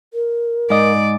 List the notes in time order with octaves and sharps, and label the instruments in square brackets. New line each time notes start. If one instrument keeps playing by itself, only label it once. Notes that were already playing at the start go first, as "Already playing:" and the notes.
[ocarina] A#4
[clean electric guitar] G#2 D#5 [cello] D5